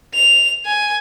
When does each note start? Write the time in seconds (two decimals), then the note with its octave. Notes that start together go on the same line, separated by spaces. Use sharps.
0.14 F7
0.65 G#5